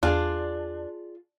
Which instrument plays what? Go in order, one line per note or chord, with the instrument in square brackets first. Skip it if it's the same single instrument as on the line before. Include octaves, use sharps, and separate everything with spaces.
[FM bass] E2 [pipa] D4 [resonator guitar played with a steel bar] F4 G#4 D5